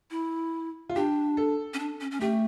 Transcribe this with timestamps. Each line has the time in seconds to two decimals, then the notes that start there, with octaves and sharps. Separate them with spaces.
0.11 E4
0.89 F4
0.96 D4 G4
1.37 A4
1.74 C#4
1.79 D4
2.01 C#4
2.11 C#4
2.21 A3 G4